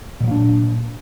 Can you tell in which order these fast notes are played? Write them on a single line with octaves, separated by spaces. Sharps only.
A#2 F#3 A#3 D4